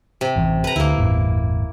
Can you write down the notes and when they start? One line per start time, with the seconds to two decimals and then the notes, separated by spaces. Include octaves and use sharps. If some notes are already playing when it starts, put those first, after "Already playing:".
0.21 C3
0.35 A1 F#2 E3
0.64 B4 A#5
0.76 D2 A#3 E4
0.97 G1 E2 A2